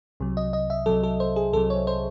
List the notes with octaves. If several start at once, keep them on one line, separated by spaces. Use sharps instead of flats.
C2 C3 F#3
D#5
D#5
E5
C2 C3 F#3 A4
A4
C5
G#4
C2 C3 F#3 A4
C#5
C5